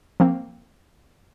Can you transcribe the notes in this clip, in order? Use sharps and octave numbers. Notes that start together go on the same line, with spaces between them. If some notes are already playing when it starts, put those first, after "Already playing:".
F3 A#3 C4